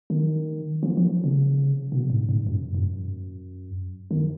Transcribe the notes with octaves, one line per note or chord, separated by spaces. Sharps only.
D#3
F3
F3
C#3
B2
G#2
G#2
F#2
F#2
D#3